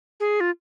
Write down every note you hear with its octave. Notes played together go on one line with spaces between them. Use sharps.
G#4
F4